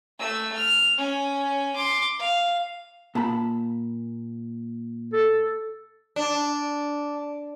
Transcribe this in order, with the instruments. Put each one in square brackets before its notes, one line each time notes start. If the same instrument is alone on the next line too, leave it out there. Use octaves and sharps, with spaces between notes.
[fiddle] A3 E6
F6
C#4 G#5
C6 D6
F5
[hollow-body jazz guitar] A#2 A5 B5
[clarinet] A4
[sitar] D4